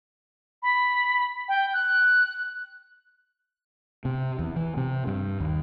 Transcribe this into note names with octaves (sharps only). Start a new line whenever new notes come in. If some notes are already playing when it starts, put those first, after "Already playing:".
B5
G5
F#6
C3
E2
E3
C3
G2
D#2